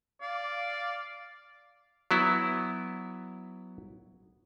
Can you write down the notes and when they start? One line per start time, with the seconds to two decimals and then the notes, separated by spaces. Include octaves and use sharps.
0.21 D5 F5
2.11 F#3 B3 E4